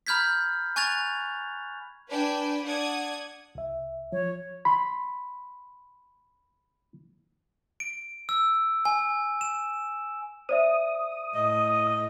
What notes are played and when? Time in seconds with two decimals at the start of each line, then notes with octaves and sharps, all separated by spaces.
0.07 A#5 B5 F6 G6 G#6 B6
0.76 G#5 C#6 F#6 G#6 A6 F7
2.11 D4 B4 G5 G#5
2.65 D4 D5 F#5 D#6 G#6
3.55 C2 E5
4.12 F3 C#5
4.65 B5 C6
7.80 D7
8.29 E6
8.85 G#5
9.41 E7
10.49 C5 D5 E5 D#6
11.35 A2 D#5